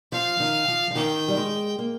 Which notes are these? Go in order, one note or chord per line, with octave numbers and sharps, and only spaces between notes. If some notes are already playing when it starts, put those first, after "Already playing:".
F3 F5
D#3
F3
F3
D#3 G5
G3
G#3
A#3